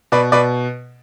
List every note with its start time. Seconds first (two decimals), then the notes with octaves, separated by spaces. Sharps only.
0.12 B2 B4 D5
0.32 B2 B4 D5